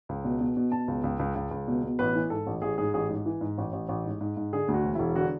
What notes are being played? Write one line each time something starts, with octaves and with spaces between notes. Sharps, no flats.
C#2
B2
B2
B2
B2 A5
C#2
C#2
C#2
C#2
C#2
B2
B2
A1 B4
E3
G#2 A4
A1
A1 G#4
G#2 G#4
A1 G#4
G#2
E3
G#2
A1
A1
A1
G#2
G#2
G#2
D3 G#4
D2
F#4
E1
E1 E4
D3 F#4